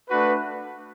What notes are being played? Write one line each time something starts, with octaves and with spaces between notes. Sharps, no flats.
A3 D4 F#4 B4